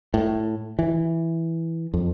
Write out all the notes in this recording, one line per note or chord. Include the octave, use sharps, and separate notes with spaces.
A2
E3
F2